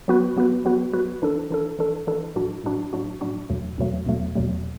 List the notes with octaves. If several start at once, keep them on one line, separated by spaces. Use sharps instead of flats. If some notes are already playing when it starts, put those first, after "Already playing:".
F#3 B3 F#4 B4
F#3 B3 F#4 B4
F#3 B3 F#4 B4
F#3 B3 F#4 B4
E3 D4 A4
E3 D4 A4
E3 D4 A4
E3 D4 A4
A2 F#3 D4 F#4
A2 F#3 D4 F#4
A2 F#3 D4 F#4
A2 F#3 D4 F#4
E2 B2 F#3 A3
E2 B2 F#3 A3
E2 B2 F#3 A3
E2 B2 F#3 A3